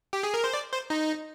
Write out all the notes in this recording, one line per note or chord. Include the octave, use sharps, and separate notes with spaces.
G4
G#4
A#4
C5
D5
C5
D#4